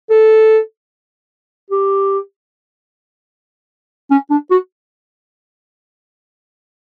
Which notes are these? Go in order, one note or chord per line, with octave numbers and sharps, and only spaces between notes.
A4
G4
C#4
D4
F#4